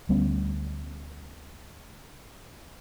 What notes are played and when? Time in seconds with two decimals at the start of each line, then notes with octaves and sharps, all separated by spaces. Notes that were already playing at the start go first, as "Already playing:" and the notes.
0.09 D2 G3 B3 C#4